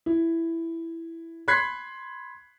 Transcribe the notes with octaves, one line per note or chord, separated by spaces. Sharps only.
E4
B5 C6 F#6 G#6 B6 C7